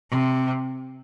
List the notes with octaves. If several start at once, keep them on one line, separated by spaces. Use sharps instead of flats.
C3